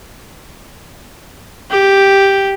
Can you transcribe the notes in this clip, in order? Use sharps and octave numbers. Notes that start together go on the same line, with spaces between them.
G4